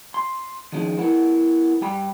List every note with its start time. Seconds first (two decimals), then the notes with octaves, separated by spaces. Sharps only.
0.14 C6
0.72 D#3 F3 G#3 C#4 D#4
0.98 B3 E4 A#4 F#5
1.81 G2 G4 B5